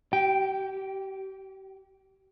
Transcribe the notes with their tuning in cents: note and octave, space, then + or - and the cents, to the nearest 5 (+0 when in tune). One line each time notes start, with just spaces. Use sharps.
G4 -35 G5 +0